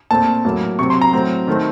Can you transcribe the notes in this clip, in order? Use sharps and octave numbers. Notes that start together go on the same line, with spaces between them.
A#2 A3 C4 A5
A2 F#3 A#3
C3 F#3 C4 C#6
C6
A#5
A2 F#3 C4
D#3 A3 C4